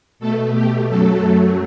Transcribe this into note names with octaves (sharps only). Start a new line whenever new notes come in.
B2 A3 A4
G4
F#2 F#3 A3 A4